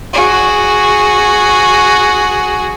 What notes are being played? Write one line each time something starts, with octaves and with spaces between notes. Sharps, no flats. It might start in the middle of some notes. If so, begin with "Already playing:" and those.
F#4 G#4